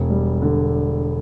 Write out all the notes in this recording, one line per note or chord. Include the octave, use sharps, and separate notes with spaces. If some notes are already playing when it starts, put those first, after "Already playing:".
Already playing: E1
G3
D3